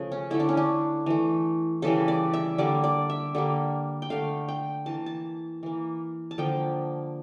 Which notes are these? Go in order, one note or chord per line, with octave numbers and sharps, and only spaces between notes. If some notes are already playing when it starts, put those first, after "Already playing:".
Already playing: C#3 F3 A3
C#4
D3 A3 E4
D4
C#4
D4
E3 A3
C#3 E3 G3 A4
D5
E5
D3 G3 A#3 D5
D5
E5
D3 G3 A#3
G5
D3 A3 F5
G5
E3 A#3 A5
A5
E3 A#3
A5
D3 F3 A#3 G5